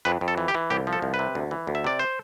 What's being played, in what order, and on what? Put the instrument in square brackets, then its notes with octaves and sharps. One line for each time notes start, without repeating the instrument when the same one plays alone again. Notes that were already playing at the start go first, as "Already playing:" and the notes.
[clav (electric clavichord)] F2 B4
F2
A4
E3
G4
E3
C2 G4
F3
A4
C2
B4
C3
D2
E3
D2
E5
C3 D5
C5